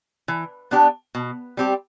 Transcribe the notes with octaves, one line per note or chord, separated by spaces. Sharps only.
E3
B3 D4 G4
B2
G3 C4 G4